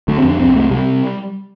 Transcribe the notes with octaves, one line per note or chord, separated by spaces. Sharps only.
D3 A3
C4
F2 D4
C2 C4
C3 A3
C3 G3